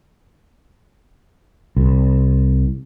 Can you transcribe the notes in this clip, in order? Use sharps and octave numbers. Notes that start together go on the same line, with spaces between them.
C2